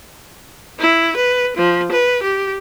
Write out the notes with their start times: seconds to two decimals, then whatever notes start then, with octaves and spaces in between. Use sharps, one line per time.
0.80 E4
1.16 B4
1.57 F3
1.92 B4
2.22 G4